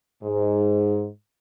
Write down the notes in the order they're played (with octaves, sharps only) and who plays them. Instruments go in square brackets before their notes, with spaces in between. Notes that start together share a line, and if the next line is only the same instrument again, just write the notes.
[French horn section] G#2